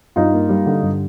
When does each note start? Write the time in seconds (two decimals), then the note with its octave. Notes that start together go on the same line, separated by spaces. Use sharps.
0.16 G2 D#4 F4
0.33 A#3
0.49 G3
0.66 D3
0.83 G2